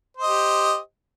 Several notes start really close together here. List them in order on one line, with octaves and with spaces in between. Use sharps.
C5 D#5 G4